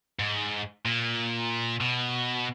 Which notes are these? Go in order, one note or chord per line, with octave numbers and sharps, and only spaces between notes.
G#2
A#2
B2